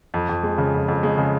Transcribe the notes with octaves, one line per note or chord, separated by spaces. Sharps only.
F2
F2
G#3
C#3
F2
F2
G#3
C#3